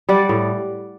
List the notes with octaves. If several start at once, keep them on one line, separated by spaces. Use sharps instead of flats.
G3 D5 F#5
A2